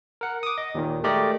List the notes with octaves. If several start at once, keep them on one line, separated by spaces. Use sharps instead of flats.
A#4 F#5
D6 D#6
D#5
D#2 A#2 D#3
G#3 A3 G4 A#4 D5 D#5